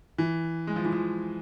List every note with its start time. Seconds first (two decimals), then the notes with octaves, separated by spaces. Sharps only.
0.18 E3
0.67 G#3
0.76 F3
0.85 E3
0.92 F3